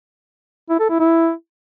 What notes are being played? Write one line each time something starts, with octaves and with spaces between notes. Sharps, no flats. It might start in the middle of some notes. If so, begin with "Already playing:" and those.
E4
A4
E4
E4